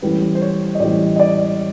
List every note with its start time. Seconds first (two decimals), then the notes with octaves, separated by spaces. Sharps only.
0.02 A1 A2 E3 G3 B4
0.35 C5
0.42 C#5
0.75 D#5
0.80 A1 A2 E3 G3 D5
1.16 D#5
1.20 D5